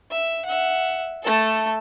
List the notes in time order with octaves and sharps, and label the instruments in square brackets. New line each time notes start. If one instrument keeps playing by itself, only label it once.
[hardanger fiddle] E5
E5 F#5
A3 A4